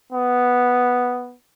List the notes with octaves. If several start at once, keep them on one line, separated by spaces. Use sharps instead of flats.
B3